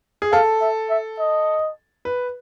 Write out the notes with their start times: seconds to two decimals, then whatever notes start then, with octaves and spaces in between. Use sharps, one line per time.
0.22 G#4
0.33 A4 F5
0.61 E5
0.90 E5
1.19 D#5
2.05 B4